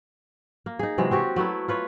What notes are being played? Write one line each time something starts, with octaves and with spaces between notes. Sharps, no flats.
A#3
D#4 G#4
C3 E3 F#3 G#3
C4 F#4 G4 C#5
F#3 A3 B3 E4
F4 B4 C#5